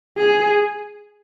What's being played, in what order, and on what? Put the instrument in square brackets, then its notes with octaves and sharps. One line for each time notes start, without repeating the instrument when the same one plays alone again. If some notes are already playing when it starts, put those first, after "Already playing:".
[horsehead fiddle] G#4